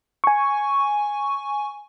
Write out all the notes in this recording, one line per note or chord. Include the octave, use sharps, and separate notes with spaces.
G#5 C#6